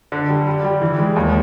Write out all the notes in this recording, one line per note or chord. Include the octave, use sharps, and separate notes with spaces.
D3
G3
G3
G3
E3
G#3
D#2